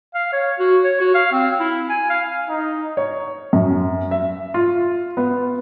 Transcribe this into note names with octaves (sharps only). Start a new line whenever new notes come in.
F5
C#5
F#4
C#5
F#4
F5
C4
E4
G#5
F5
D#4
C#5
F#2
E5
F4
B3